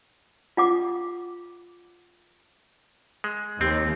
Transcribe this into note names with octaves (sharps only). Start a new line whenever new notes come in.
F4 F#5 D6
G#3
D#2 C4 G4